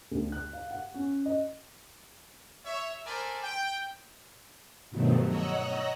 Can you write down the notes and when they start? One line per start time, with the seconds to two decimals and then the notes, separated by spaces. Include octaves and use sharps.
0.11 D2
0.32 F#6
0.53 F5
0.71 F#5
0.94 C#4
1.26 D#5
2.65 C#5 E5
3.06 A4 A#4 C5 D5 G#5 B5
3.43 G5
4.90 G2 B2 D#3 F3 F#3 A3
5.26 C#5 D#5 F#5 A#5 E6 F#6